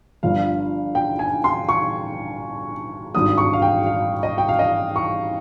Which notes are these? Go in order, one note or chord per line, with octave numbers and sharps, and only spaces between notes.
G1 G2 F3 F5
G5
G#5
C6
C#6
G#1 G2 G3 D#6
C#6
F5
G5
F5
D#5
G5
F5
D#5
C#6